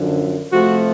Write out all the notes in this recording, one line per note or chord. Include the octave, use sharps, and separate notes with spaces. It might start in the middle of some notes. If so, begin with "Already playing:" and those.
Already playing: F#2 D3 F3
C3 F3 A3 F#4